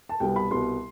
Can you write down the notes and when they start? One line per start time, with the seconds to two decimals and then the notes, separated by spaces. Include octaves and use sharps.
0.09 A5
0.20 C2 B2 G3 B3 G5
0.36 B5
0.51 C2 B2 G3 B3 C6